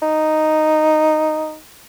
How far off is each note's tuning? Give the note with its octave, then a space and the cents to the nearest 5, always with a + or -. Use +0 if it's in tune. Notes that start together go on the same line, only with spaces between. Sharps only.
D#4 -5